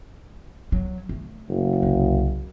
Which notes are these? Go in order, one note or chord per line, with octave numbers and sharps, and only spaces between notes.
F#3
A3
F#1
C2